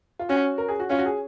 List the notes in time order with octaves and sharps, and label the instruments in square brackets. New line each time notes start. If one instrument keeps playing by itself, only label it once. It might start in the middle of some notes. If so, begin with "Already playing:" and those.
[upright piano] F4
[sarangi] C#4 [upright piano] F#4
[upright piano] A#4
G#4
F#4
[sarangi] C#4 [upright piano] F4
[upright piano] F#4
G#4